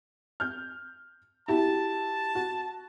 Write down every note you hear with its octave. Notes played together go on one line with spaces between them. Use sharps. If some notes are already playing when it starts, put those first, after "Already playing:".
F6 G6
E4 F#4 G4 A5
F#4